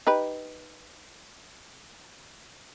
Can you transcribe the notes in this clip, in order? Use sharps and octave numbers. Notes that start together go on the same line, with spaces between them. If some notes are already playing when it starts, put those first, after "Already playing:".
D#4 G4 B4